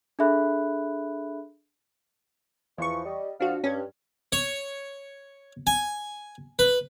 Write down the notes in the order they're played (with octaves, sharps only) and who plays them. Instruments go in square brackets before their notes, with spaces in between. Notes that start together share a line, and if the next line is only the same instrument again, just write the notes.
[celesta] D4 G#4 A4 E5 B5 F#6
[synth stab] E2 C#6 [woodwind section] E3 F3
[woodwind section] G3 D#5
[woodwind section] F2 F3 F5 [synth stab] D4 F#4
[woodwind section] G2 [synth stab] C#4
[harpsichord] C#5
G#5
B4